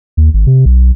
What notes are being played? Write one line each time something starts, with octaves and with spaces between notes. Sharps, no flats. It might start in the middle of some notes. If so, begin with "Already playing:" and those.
D#2
G#1
C3
B1